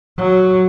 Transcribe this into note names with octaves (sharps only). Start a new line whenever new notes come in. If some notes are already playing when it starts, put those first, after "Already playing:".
F#3